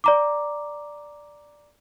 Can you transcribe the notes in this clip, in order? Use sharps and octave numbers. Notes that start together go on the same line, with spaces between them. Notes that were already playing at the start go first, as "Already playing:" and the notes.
D5 A#5 D6